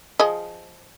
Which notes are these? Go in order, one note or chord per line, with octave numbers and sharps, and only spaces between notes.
F3 G#4 D#5